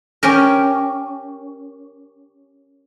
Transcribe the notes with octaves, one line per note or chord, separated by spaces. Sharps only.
C#4 G4 A#4